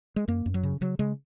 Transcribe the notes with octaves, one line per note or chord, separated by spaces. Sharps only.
G#3
F#2 A#3
F#2
F#3
C#3
C#3 F#3
C#3 G#3